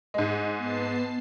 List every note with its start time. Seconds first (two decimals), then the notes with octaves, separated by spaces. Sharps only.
0.14 G#2 G#3
0.57 B3 A5 C7